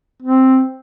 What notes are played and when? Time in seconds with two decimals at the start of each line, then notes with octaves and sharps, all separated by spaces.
0.23 C4